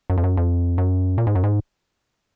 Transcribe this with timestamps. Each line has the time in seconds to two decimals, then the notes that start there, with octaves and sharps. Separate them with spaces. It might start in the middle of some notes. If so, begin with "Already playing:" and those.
0.10 F#2
0.17 F2
0.24 F#2
0.37 F2
0.78 F#2
1.18 A#2
1.27 G#2
1.35 F#2
1.44 G#2